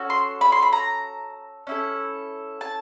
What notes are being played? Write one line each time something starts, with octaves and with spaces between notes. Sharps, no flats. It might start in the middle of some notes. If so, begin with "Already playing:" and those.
Already playing: C#4 F#4 A4
C6
B5
C6
B5
A#5
C#4 E4 A4
A5